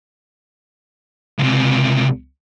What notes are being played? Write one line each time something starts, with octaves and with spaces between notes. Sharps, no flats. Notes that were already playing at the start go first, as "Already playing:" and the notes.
C#2 C3